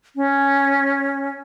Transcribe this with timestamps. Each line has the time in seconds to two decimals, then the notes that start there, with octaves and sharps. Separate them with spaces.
0.16 C#4